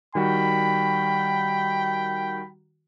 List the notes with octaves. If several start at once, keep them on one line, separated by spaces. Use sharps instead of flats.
D#3 G3 F#4 G5 B5